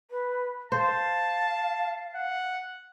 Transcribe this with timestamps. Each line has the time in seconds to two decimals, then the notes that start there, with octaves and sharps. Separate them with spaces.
0.11 B4
0.72 C5 F5 A5
2.15 F#5